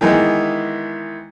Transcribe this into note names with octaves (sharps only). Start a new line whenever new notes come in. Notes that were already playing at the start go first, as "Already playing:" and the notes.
D#3 E3 G#3 B3